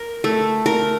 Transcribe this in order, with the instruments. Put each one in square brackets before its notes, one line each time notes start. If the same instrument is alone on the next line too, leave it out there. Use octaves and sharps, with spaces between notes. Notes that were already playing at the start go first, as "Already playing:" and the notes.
Already playing: [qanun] A#4
A3
A#4